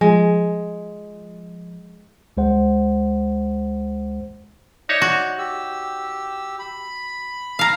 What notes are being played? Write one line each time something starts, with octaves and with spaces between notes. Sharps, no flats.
F3 G#3
C#2 G#3 C5 F#5
D#4 C#5 D5 E5 F#6
F#4
G4 E6
B5
F5 A#5